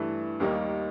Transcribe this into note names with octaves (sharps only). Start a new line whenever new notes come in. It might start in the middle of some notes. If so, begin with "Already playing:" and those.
Already playing: G2 E3 A3
D#2 D#3 G3 A#3 D#4